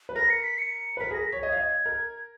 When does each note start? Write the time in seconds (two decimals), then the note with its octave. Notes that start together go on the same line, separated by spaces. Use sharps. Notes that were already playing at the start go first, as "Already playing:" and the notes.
0.09 B4
0.16 A#4 A#6
0.30 C#7
0.44 B6
0.58 C#7
0.97 B4
1.00 A#4 B6
1.11 G#4 A#6
1.27 B6
1.32 C#5
1.42 D#5 G#6
1.52 F5
1.57 D#5
1.86 A#4